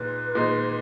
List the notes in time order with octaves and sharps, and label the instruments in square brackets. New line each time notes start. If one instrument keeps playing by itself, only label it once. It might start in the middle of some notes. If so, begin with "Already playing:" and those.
Already playing: [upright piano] A#2 G#3 D#4 [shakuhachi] B4
[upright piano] A#2 G#3 D#4